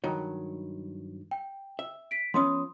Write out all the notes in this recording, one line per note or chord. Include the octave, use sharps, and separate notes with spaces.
G2 D#3 F#3
G5
E5
B6 D7
F3 B3 C#4 C6 D#6